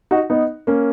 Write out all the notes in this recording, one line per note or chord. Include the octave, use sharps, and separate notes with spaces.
D#4 F#4
B3 D#4
A#3 C#4